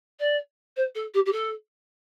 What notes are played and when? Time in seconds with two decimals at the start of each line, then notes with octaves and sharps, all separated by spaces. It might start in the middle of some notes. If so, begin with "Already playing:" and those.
0.20 D5
0.77 C5
0.95 A4
1.14 G4
1.26 G4
1.32 A4